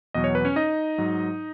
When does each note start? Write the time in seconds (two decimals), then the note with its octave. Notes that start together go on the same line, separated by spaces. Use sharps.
0.14 E2 B2 F#3 D#5
0.24 C#5
0.35 B4
0.45 C#4 C#5
0.56 D#4 D#5
0.98 G#2 F#3